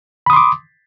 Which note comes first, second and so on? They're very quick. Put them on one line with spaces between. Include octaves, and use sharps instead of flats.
B5 D#6 C6 D6